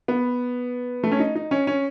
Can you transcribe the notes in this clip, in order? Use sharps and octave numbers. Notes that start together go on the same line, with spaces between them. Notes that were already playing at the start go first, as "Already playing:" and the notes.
B3
A3
C#4
D#4
D#4
C#4
C#4